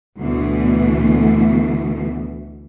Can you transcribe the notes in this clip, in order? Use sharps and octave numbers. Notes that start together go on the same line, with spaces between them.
D2 B2 E3 A3